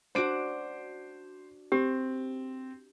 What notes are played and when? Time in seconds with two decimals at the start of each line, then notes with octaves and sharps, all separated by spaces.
0.15 D4 F#4 C5 D7
1.72 C4 G4